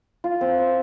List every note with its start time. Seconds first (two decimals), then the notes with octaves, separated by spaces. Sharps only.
0.24 F4
0.41 C4
0.58 E5